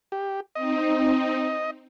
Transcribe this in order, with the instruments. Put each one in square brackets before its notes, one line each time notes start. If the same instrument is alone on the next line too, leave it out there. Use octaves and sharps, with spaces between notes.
[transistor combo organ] G4
[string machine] C4 D#4 [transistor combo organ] D#5